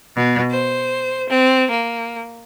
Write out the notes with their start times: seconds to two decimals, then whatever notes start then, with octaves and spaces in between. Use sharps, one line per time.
0.15 B2
0.51 C5
1.29 C4
1.70 A#3